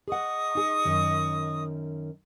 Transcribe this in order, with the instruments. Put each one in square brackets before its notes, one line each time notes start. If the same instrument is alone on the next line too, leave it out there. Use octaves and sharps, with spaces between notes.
[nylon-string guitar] G#4 F#5 [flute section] D#5 C#6 D#6
[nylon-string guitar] D#4 G#4
F#2 D#3